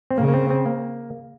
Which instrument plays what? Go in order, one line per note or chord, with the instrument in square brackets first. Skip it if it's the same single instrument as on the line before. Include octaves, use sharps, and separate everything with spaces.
[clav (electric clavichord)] C4
[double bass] C#3 [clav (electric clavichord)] A#3
[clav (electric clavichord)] A#3
C4
C4
A#3